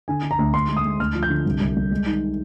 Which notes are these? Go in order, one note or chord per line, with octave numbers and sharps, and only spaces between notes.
D3 G#5
D3
A#5
D2
D2 C6
G#3
D#6
G#3
D2 F6
F3
G6
D3
C2
C2
G3
G#3
D#3